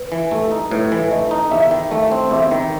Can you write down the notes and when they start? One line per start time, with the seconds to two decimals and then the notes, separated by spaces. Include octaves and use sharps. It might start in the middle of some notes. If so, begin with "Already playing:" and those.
Already playing: B4
0.12 E3
0.31 A3 A4
0.52 D#4
0.71 A2 B4
0.92 E3
1.11 A3 D#5
1.31 D#4
1.51 E2 E5
1.71 D#3
1.91 A3 E5
2.12 C4
2.31 E2 E5
2.51 D#3